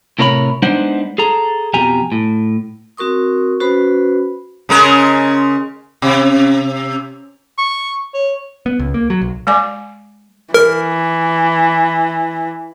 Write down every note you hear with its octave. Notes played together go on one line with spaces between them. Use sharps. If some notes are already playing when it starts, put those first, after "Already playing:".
A2 C3 A#4 C#5 F5 B5
G#3 B3 D4 D#4 C5 F#5
G#4 A4 A#5
F2 B2 G4 G#5 A#5
A2
C4 F#4 A#4 C#6 D#6
C#4 F#4 B4 C5 B5
C#3 G#3 A#4
C3
C#6
C#5
B3
C#2
A#3
F#3
B1
G#3 D5 G#5 D6
E3 A#4